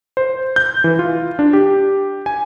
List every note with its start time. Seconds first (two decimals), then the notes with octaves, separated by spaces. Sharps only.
0.17 C5
0.56 G6
0.84 E3
0.99 F4
1.39 D4
1.53 G4
2.26 G#5